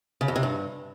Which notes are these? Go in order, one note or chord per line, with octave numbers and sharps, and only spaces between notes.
C#3
F2
C3
G2